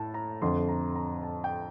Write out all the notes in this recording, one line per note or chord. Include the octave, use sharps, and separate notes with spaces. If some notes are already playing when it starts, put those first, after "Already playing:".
Already playing: A2 A5
A#5
F2 D3 A3 C4 C6
A#5
A#5
A5
G5